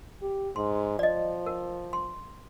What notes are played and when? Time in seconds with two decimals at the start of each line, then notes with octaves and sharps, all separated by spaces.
0.22 G4
0.56 G#2 C6
0.99 F3 D5 D#5
1.46 A#4
1.93 C6